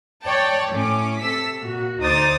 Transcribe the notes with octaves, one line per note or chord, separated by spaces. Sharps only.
C#5 D5 G5 A5
A2 C#4 D6
C3 A4 E6 B6
A#2 F#4
D2 D#4 C5 D6 D#6 A6